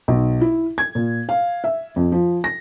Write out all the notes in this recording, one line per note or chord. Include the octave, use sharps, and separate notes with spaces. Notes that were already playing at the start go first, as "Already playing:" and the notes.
B1
E4
G#6
A#2
F5
E5
F2
F3
A#6